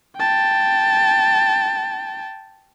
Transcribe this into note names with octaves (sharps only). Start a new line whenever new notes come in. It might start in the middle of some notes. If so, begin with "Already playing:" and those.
G5 A5